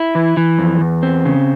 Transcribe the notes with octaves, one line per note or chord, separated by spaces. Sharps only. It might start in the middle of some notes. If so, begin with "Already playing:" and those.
Already playing: E4
E3
E3
F2
E2
C4
C#3